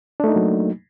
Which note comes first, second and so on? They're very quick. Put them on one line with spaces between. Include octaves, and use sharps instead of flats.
D4 A3 D#4 A#3 F#3